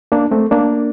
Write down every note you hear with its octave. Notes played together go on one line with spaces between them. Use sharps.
A#3 D4
A3 C4
A#3 D4